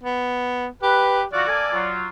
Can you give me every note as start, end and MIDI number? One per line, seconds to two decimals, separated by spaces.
0.03 0.67 59
0.82 1.25 67
0.82 1.20 71
1.33 1.46 52
1.33 1.46 65
1.33 1.46 66
1.33 1.91 74
1.47 1.71 58
1.47 1.71 69
1.47 1.71 80
1.73 2.06 54
1.73 2.06 65